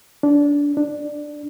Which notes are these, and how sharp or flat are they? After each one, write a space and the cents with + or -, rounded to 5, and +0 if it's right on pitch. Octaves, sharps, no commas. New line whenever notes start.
D4 -20
D4 +10